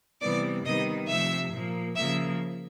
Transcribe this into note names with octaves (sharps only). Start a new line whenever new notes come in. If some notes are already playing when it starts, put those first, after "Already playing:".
C3 E3 G3 B3 D5 D6
C3 D#3 G3 B3 D#5 D#6
C3 F3 A3 E5 E6
A#2 F3 A#3
C#3 F3 A#3 E5 E6